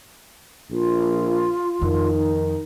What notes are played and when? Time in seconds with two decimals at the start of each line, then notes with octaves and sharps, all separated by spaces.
0.71 A#1 F4
1.82 F2 D#3
2.17 D#4